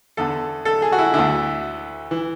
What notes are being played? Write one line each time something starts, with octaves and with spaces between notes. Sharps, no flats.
E2 D3 A4
A4
G#4
F#4
E4
D2 D3 E4
E3